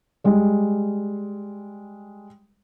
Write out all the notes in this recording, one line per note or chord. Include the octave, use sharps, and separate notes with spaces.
G3 G#3